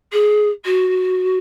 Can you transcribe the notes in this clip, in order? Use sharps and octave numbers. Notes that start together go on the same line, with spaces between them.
G#4
F#4